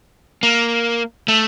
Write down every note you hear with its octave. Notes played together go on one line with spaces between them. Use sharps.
A#3
A3